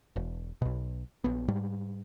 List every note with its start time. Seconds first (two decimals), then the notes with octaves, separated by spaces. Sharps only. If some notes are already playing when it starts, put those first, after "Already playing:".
0.16 E1
0.62 B1 B2
1.24 A#1 B3
1.48 G#2 G3